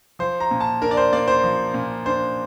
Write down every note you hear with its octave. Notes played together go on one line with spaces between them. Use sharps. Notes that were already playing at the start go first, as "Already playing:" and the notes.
F3 C5
A#5
A#2
A5
D4 A#4
D5
C5
A#3 D5
C5
F3
A#2
D4 C5